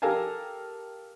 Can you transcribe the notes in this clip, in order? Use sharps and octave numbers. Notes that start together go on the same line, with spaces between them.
G4 A4 A#4 F5 G#5 A5